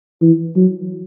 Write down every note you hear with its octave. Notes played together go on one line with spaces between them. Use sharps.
E3
F#3